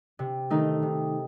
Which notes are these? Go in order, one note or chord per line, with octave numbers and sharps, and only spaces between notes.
C3
D#3 A3 D#4
C3